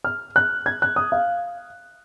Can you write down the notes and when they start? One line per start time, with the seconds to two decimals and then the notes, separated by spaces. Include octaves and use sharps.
0.04 F6
0.36 F#6
0.66 G#6
0.82 F#6
0.96 D#6
1.12 F5